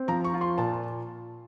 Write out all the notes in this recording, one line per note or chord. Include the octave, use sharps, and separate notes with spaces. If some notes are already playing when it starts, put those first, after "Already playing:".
Already playing: C4
F3 A#5
C#6
F4
C6
A#2 A5